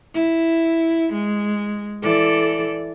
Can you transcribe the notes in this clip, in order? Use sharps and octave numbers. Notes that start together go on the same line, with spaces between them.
E4
G#3
E3 A4 D5